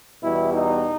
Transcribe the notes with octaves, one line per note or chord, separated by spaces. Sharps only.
E2 B2 G3 E4
D#4